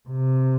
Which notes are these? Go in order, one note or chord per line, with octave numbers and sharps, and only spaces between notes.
C3